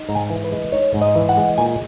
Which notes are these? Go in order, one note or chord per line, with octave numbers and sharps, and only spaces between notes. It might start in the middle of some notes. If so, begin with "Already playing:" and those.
Already playing: D#4
G#2 A#5
G#5
E3
B4
G#3
D#4 C#5
G#2
D#5
E3
F#5
G#3
A#2 G#5